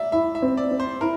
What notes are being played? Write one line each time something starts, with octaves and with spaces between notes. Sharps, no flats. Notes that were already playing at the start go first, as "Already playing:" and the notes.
Already playing: D5 E5
E4 E5
E5
C4
D5
C4
C5
E4 A#4